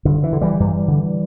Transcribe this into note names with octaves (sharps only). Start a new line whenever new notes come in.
G2 D3
E3
D3
E3 G3
G2
D3